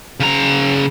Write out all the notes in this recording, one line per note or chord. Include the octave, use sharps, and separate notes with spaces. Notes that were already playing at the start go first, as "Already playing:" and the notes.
C#3 A#5